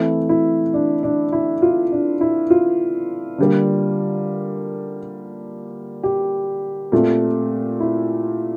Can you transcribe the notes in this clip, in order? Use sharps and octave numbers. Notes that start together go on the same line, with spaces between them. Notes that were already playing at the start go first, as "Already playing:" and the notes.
Already playing: E3 A3 C4 E4
E4
D4
D4
E4
F4
D4
E4
F4
D3 G3 A#3
G4
A#2 A3 C4
E4